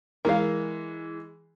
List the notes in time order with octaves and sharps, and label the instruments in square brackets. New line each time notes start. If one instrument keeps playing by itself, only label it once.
[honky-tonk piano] E3 G#3 [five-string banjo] A#4 F5